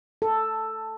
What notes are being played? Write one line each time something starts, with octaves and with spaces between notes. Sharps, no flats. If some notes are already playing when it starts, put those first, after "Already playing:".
A4